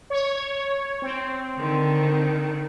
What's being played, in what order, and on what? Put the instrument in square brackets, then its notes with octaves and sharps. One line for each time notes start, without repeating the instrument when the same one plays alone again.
[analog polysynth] C#5
C4
[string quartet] D3 D#3